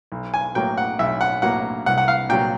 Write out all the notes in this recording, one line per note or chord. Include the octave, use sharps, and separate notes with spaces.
B1
G#5
A2 F#3 A#3 G5
F#5
B1 E5
F#5
A2 F#3 A#3 F#5
C2 F#5
F#5
F5
A#2 F#3 G5